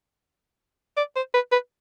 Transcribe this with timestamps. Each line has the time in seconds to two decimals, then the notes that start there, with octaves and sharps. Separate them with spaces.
0.97 D5
1.16 C5
1.34 B4
1.52 B4